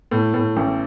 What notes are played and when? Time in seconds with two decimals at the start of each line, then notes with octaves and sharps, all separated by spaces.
0.11 A2
0.34 A2
0.57 A1